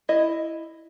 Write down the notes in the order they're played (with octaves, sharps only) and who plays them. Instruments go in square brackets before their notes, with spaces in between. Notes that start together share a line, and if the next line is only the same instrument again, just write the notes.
[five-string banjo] E4 D#5